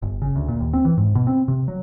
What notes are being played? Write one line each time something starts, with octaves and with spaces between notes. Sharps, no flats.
G1
C#3
D2
A#2
D#2
C4
E3
G#2
B2
C4
C3
F#3